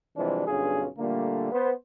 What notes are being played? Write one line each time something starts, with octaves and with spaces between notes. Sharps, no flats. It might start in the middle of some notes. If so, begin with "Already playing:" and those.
C3 E3 F3 G3 G#3 D4
B1 G2 D3 C#4 F4 G#4
A#2 D3 G3 A3 A#3
B3 C5